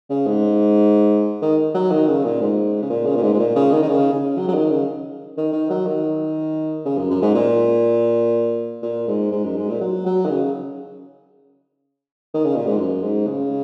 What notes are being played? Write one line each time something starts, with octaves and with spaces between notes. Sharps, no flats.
C#3
G#2
D#3
F#3
D#3
C#3
A#2
G#2
C#3
A#2
C#3
A#2
G#2
G#2
A#2
C#3
D#3
D#3
C#3
C#3
F#3
F#3
D#3
C#3
D#3
D#3
F#3
D#3
C#3
F#2
F#2
G#2
A#2
A#2
G#2
G#2
F#2
G#2
A#2
F#3
F#3
D#3
C#3
D#3
C#3
A#2
G#2
F#2
G#2
C#3